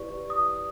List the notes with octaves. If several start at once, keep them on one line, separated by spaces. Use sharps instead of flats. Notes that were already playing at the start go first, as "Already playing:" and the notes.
Already playing: E4 G4 B4 D5 C#6
D#6